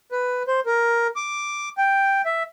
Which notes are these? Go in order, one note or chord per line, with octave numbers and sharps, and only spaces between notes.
B4
C5
A#4
D6
G5
E5